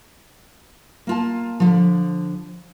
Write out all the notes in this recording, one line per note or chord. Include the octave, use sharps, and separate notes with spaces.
A#3 F4 A5
D3 F3